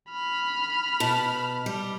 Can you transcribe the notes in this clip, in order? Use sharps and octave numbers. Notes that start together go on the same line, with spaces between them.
B5 F6
B2 A5
G3